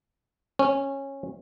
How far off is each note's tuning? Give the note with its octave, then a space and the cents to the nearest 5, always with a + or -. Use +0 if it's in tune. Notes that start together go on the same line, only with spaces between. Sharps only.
C#4 -15